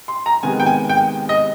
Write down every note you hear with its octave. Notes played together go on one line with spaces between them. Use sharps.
C6
A#5
C3 D#3 G#3 B3 G#5
G5
G#5
G5
D#5